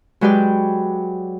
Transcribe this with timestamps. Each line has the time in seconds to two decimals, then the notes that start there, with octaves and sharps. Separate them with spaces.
0.21 F#3 G#3 G4 B4 D5 G5